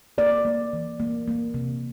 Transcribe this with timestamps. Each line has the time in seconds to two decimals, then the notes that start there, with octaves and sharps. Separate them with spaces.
0.18 A#3 D5
0.45 A#3
0.73 E3
1.00 A#3
1.28 A#3
1.54 C3